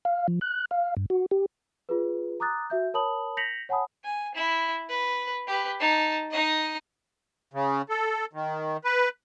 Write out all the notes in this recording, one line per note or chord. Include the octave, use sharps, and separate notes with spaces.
F5
F3
F#6
F5
G2
F#4
G4
F4 G#4 B4
A#5 D6 D#6 F#6 A6
F#4 E5 G6
A#4 C#5 A5 B5 D#6 F#7
G6 A#6 B6 C#7 F7 F#7
C#5 F#5 G#5 A5 B5 D#6
G#5
E4
B4
G4 B4
D#4 A5
D#4 D#5
C#3
A4
D#3
B4